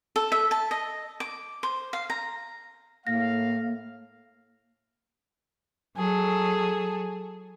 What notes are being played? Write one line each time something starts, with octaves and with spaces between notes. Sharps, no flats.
A4
E5
A5
D#5
D6
C5
F5
A#5
A2 A#3 F5 A#6
F#3 G#4 A4